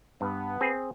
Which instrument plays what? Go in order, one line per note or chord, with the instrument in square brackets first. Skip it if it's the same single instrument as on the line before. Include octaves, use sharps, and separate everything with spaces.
[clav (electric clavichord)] G2 [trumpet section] B3
[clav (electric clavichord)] C4 G#4